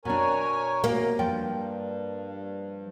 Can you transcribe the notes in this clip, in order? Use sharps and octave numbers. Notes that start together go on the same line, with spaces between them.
B2 D4 A#4 C#5 G#5
C3 F#3 A#3
G2 F3 G5